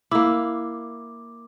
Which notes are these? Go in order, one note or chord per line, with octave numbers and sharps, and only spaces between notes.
A#3 E4 D6